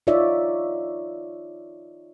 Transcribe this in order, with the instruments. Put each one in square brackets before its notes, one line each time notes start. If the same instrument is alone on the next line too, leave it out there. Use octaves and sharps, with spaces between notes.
[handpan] D#4 F4 C#5 D5 E5